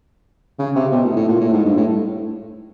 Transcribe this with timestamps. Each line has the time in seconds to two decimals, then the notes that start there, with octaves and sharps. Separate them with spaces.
0.59 C#3
0.76 C3
0.92 B2
1.04 A2
1.16 A2
1.28 A#2
1.41 A2
1.53 G#2
1.65 G2
1.77 A2